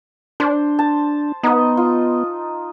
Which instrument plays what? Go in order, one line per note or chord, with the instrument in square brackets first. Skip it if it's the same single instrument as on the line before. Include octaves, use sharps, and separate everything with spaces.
[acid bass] D4 [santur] C5
[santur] A5
[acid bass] B3 [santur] D#4 D#5
[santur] F4